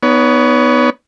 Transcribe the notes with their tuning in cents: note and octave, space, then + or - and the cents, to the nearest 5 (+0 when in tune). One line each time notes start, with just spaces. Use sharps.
B3 +0 D#4 +0 C#5 +30